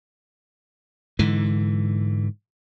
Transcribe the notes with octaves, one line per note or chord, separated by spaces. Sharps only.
G#2 D3 E3